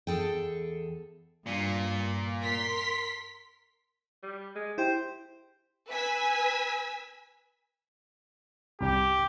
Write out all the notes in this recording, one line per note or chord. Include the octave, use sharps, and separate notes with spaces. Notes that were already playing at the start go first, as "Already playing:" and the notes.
E2 G#4 A4 G5
G2 A#2
A#4 C6 B6
G3
G#3
E4 G4 C5 G5
B4 G#5 E6 B6
C2 G3 G4